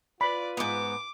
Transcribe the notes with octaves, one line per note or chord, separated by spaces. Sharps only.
F4 B4 D5 B5
G#2 B3 D6